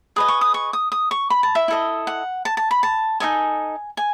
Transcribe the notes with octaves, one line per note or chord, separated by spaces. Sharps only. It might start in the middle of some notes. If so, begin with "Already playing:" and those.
G#4 B4 D#5 D#6
C#6
D#6
C#6
D#6
D#6
C#6
B5
A5
E5
E4 A4 D#5
F#5
A5
A5
B5
A5
D#4 F#4 A4 D#5 G#5
G#5